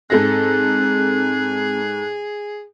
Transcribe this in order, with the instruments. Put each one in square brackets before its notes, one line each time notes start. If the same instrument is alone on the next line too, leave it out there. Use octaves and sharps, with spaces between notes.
[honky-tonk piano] G#2 A4 A#6 [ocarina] C4 [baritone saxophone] G#4 [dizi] F#6